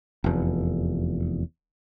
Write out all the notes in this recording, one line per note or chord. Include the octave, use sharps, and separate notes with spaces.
F1 E2